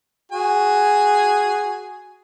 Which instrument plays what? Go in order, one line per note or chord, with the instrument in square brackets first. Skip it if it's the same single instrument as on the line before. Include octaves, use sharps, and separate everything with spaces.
[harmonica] F#4 G#4 G#5